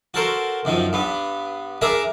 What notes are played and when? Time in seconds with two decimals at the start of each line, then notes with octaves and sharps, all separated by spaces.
0.14 F#4 A4 A#4 C5 C#6
0.65 F#2 D#3 F3
0.93 G2 B3
1.81 D4 G#4 A#4 E5 A#5